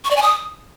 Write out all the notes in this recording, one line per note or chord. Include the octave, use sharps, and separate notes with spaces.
C#6
D5
G#5
D#6